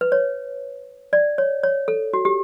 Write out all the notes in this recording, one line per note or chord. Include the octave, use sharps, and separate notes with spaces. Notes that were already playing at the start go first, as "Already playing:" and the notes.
B4
C#5
D5
C#5
C#5
A4
F#4
G4